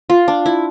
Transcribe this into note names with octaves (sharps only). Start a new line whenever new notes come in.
F4
D4
E4